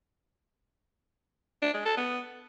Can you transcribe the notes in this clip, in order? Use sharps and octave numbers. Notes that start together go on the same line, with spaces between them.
D4
G#3
A4
B3